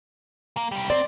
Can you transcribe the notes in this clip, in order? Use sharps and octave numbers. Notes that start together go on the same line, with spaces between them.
A#3
C2 G3
C4 D5